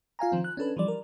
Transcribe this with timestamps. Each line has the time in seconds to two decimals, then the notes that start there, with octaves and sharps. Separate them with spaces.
0.19 F4 F5 G#5 A#5
0.32 D#3 F3 C4
0.44 F#6
0.57 C#4 D4 A4 B4
0.77 E3 F3 G3 D5
0.88 A#4